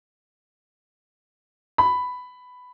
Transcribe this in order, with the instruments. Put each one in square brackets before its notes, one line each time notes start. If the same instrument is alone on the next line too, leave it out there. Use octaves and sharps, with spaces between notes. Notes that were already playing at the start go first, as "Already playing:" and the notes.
[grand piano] B5